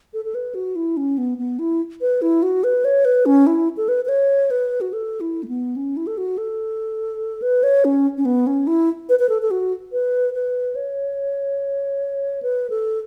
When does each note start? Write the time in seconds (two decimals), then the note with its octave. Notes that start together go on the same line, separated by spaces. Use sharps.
0.14 A4
0.25 A4
0.35 B4
0.55 F#4
0.76 E4
0.97 C#4
1.18 B3
1.38 B3
1.59 E4
2.01 B4
2.22 E4
2.43 F#4
2.64 B4
2.85 C#5
3.05 B4
3.26 C#4
3.47 E4
3.77 A4
3.89 B4
4.05 B4
4.09 C#5
4.51 B4
4.81 F#4
4.93 A4
5.21 E4
5.43 A3
5.48 B3
5.76 C#4
5.97 E4
6.07 A4
6.18 F#4
6.38 A4
7.42 B4
7.63 C#5
7.85 C#4
8.18 C#4
8.25 B3
8.47 C#4
8.67 E4
9.09 B4
9.19 B4
9.29 A4
9.42 A4
9.51 F#4
9.92 B4
10.34 B4
10.75 C#5
12.43 B4
12.70 A4